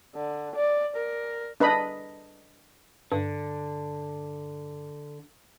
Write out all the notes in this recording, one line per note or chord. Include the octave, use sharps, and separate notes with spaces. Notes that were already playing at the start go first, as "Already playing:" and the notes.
D3
D5
A#4
D4 B4 D#5 B5
G2 D3